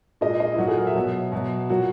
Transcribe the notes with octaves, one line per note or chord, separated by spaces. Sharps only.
A#2 G#3 D#5
D#5
E4
A#2 F#3 F#4
G#4
A#4
E5
B2 F#3
B2 F#3
A#2 F#3 F#4